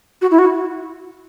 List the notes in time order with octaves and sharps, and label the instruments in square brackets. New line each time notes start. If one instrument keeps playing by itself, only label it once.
[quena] F#4
E4
F#4